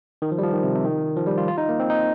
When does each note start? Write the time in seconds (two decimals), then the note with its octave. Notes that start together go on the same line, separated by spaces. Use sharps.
0.22 D#3
0.32 F3
0.38 G3
0.43 F3
0.53 D#3
0.64 C3
0.75 C3
0.85 D#3
1.17 F3
1.27 G3
1.38 F4
1.48 F4
1.58 D#4
1.69 A#3
1.80 C4
1.90 D#4